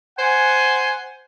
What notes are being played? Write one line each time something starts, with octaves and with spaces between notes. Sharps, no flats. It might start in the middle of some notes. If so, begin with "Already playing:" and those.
C5 F#5 G#5